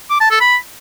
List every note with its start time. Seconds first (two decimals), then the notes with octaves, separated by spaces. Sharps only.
0.10 D6
0.20 A5
0.30 A4
0.40 B5